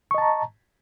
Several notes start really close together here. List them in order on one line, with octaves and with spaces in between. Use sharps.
C#6 D#5 A5 A#5